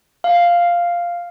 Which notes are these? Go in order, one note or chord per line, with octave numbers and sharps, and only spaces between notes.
F5